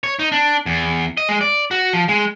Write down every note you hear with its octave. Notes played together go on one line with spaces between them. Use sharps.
C#5
D#4
D4
E2
D#5
G#3
D5
F#4
F3
G#3